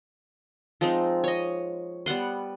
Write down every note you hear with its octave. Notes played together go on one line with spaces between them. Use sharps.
F3 G#3 C4 D#4
C#5 D#5
G3 B3 F#5 C6